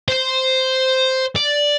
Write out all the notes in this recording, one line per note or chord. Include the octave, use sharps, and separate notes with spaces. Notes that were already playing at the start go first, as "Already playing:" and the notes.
C5
D5